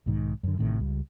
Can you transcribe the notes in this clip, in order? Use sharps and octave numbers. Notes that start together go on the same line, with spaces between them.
B1 G#2 D#3
F#2 D3
A1 A2 C3 D#3
C#2 G3